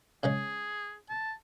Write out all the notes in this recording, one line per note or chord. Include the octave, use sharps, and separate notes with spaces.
C#3 G#3 C#4 G#4
A5